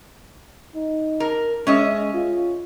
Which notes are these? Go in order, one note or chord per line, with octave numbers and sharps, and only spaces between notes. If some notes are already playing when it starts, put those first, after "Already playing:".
D#4
A#4
G#3 C#4 D#5 E5
F4